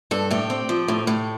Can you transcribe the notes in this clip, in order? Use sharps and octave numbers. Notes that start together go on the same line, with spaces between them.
G2 A4
A2 G4
C4
F3
A2
A2